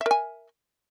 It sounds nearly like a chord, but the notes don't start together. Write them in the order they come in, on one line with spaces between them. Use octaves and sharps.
E5 A#4 G#5